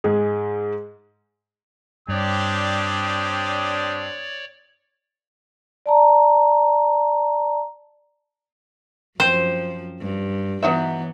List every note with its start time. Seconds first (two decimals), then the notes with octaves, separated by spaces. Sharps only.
0.04 G#2 G#3 G#4
2.08 G2 C4 D4 G4 C#5 D5 D#6
5.86 D5 A5 A#5
9.20 F#2 F3 C4 C5
10.01 G2
10.63 E3 F#3 B3 D#4 E5